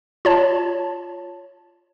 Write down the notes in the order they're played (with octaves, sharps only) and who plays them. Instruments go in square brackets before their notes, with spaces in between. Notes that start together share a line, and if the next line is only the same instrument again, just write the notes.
[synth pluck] F4 C#5 A5